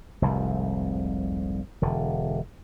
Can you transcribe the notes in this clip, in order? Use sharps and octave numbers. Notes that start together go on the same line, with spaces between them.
F1 C2 G#2
E1 D3